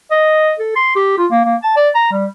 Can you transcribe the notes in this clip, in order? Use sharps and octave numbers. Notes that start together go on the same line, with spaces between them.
D#5
A4
C6
G4
F4
A#3
A#3
A5
D5
A#5
G3